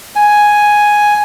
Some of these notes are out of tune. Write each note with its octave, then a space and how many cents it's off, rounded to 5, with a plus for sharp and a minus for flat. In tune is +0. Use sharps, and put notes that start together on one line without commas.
G#5 +0